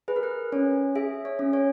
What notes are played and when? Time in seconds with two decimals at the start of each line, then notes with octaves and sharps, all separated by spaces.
0.08 G#4 B4
0.16 A#4
0.23 B4
0.52 C#4 C#5
0.95 G#4 E5
1.25 C#5
1.39 C#4
1.53 C#5